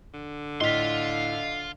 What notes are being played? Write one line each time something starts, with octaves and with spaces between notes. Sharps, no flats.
D3
A2 D#5 F5 C6 B6